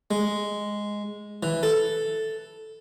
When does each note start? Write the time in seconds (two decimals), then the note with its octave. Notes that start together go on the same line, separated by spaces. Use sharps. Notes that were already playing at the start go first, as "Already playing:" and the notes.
0.11 G#3
1.43 E3
1.63 A4